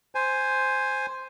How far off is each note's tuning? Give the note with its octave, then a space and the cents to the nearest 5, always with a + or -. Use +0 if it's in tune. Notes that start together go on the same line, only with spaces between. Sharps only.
C5 +0 G#5 +0